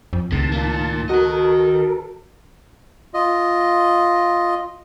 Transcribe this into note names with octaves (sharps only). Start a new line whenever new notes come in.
F2
C#2 A2 C3 D#3 A5
A#3 F4
D#3 F#4 A4 A#4 D#5
F4 D#5